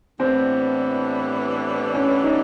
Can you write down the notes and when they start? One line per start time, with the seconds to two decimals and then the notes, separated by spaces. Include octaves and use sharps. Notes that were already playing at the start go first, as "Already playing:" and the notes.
0.20 A2 E3 G3 B3 C4 D4
1.94 C#4
2.23 D#4